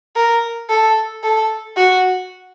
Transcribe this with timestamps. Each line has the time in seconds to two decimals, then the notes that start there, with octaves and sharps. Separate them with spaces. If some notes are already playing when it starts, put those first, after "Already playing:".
0.16 A#4
0.70 A4
1.24 A4
1.77 F#4